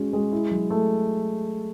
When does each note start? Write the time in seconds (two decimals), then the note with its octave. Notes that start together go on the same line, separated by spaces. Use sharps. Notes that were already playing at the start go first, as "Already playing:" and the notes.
Already playing: G#3 C#4 F#4
0.13 G#3
0.32 E4
0.51 F#3
0.70 A3